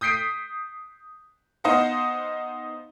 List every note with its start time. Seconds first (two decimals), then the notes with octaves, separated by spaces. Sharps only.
0.01 D#6 G6 B6 C7 D7 D#7
1.64 B3 D#4 C5 D#5 F5 F#5